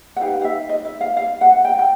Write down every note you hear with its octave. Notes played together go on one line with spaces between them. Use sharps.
F#5
D#4 G4 B4 F5
F5
E5
D#5
E5
F5
F5
F#5
G5
G5